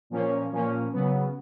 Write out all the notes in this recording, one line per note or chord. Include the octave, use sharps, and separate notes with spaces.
A#2 F3 A#3 C#4
A#2 F3 A#3 C#4
C#3 F#3 B3